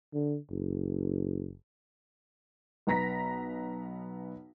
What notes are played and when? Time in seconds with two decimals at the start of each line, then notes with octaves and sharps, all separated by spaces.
0.13 D3
0.50 F#1
2.87 B1 B3 A#5 A#6 B6